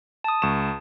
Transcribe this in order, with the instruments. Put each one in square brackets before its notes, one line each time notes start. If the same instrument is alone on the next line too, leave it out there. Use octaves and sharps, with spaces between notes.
[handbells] A5 D#6
[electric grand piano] C#2 C#6 E7